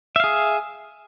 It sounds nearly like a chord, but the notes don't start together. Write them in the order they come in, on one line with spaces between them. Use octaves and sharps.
E5 F5 G#4